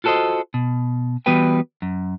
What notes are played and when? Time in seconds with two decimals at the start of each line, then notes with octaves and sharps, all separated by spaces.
0.04 F4 F#4 A4 B4 C5 D#5
0.54 B2
1.26 E3 G3 B3 F#4 B4 G5
1.82 F#2